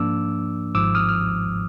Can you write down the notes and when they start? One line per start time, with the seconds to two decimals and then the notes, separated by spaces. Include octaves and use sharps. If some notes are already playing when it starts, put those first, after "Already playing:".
Already playing: G#2 F3 A#3 D4 D6 E6
0.74 G#1 G#2 F3 D6 E6
0.95 D#6 F6
1.09 F6